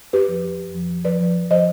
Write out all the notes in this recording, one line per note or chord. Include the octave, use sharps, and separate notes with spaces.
F2 G4 B4
F3
F2
F2
F3
F3
F3 B4 D5
F3
F3
F3 C5 D#5